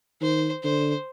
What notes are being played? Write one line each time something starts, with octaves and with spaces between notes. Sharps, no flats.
D#3 C5
D3 C5